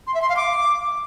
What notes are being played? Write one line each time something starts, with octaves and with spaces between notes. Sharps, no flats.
C6
E5
C6
F5
D6